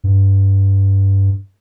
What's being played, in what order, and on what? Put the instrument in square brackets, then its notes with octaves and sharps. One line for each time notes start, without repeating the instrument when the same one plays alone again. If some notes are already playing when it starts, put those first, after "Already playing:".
[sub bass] G2